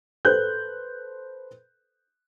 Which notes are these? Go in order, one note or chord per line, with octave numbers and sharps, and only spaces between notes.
A4 B4 C5 F#6 G6